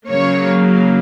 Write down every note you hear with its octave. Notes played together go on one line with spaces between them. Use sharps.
C#3 F#3 A#3 C#5